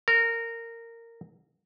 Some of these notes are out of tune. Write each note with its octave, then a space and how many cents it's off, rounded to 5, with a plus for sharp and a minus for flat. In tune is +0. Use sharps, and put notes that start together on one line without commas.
A#4 -15